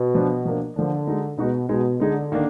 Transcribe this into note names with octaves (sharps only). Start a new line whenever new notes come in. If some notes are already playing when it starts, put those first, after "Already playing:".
Already playing: B2
F3 B3 D4
F3 A#3 D4
D3 F3 A#3 D4
G#3 D#4 F#4
B2 G#3 D#4 F#4
B2 G#3 D#4 G#4
D3 G#3 D#4 G#4
D#3 A#3 D4